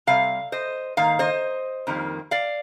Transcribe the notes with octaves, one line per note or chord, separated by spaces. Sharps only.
C3 G3 F5
C5 D#5
G#2 D#3 A#3 F5
C5 D#5
F2 D#3 G3 A#3
D5 F5